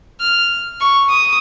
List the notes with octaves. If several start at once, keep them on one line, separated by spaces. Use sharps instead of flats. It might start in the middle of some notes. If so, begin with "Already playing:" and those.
F6
C#6
D#6